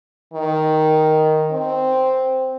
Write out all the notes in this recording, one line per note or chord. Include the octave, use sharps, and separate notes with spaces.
D#3
C4